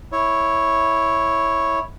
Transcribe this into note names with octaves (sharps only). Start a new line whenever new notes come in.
E4 C#5